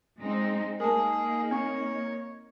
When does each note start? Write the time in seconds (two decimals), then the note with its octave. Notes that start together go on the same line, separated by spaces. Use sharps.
0.20 G#3 C4 D#4
0.80 A#3 D#4 G#4 A#4 A5
1.51 C4 C#5